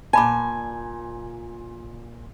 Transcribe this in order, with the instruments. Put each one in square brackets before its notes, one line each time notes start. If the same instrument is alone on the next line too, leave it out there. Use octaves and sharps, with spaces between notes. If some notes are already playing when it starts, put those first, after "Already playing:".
[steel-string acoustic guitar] A#2 G#5 [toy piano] A5 B5 D6